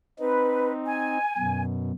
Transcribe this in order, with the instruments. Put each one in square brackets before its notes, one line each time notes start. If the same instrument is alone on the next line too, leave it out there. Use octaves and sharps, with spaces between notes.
[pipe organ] C4 D#4 [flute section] B4
[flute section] G#5
[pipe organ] F#2 B2